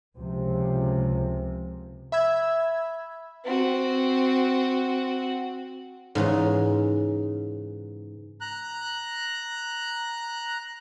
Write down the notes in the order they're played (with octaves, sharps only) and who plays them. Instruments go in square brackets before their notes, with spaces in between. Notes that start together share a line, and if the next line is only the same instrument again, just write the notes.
[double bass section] C#2 C3 F3
[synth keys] E5 B5 E6 G#6
[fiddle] C4 F#4
[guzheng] G#2 C#3 E3 C#4
[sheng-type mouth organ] A#5 F#6